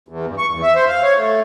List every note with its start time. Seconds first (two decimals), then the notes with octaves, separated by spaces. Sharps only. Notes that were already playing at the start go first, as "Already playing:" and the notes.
0.09 E2
0.27 G2
0.38 C#6
0.51 E2
0.62 E5
0.76 C5
0.88 F5
1.02 C#5
1.17 A3